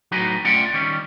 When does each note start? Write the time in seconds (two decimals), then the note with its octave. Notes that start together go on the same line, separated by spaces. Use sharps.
0.12 A2 F#3 D#4 F#4 B4 G#5
0.45 A3 C#4 F4 D5 F#5 G5
0.74 D#3 G3 C#4